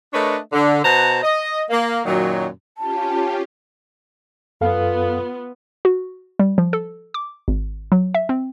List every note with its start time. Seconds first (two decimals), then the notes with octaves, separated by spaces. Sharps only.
0.13 A3 D4 A#4 B4 C#5 D#5
0.53 D3
0.84 B2 C5 F#5 A5 A#5
1.23 D#5
1.70 A#3
2.06 F#2 A#2 D#3 F#3
2.78 C#4 F4 G4 A5
4.61 F#2 B3 F4 A4 F5
5.85 F#4
6.39 G3
6.58 F3
6.73 A4
7.14 D6
7.48 G#1
7.92 F#3
8.15 E5
8.29 C4